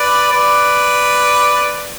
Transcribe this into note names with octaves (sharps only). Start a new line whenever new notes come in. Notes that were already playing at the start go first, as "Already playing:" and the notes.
Already playing: B4 D5
B4 D5